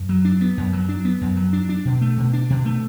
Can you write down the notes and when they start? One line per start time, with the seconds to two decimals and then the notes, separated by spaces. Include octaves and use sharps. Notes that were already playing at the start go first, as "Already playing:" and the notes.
Already playing: F#2
0.09 F#3
0.25 D4
0.41 B3
0.57 F#2
0.73 F#3
0.89 D4
1.05 B3
1.21 F#2
1.37 F#3
1.53 D4
1.69 D4
1.85 B2
2.01 A3
2.17 B2
2.33 D4
2.50 B2
2.65 A3